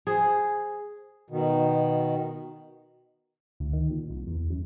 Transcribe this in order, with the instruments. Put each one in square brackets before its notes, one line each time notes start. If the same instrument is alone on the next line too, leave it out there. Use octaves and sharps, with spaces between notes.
[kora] G#4 C5
[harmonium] B2 D#3
[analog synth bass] D2
D#3
A#2
C2
E2
F#2